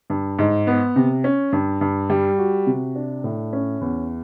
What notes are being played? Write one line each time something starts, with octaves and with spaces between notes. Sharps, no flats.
G2
G#2
B3
C3
C#4
G2
G2
G3
F#4
C3
D4
A2
C#4
E2